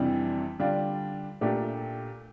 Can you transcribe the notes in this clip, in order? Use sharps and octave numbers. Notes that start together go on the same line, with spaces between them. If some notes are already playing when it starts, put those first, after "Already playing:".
Already playing: F2 C3 E3 G3 D4
D3 G3 D4 F4
A#2 A3 D4 G4